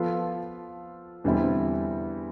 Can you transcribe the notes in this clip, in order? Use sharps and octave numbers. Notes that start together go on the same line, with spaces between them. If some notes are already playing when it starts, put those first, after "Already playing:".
Already playing: F3 B3 F4 A4
E2 D3 G3 C4 E4